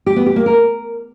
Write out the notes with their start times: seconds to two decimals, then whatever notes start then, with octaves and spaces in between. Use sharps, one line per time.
0.06 G4
0.16 B3
0.26 G4
0.36 A#3
0.46 A#4